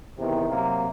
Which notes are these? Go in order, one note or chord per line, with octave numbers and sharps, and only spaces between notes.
E2 C3 D#3
C3 F#3 A#3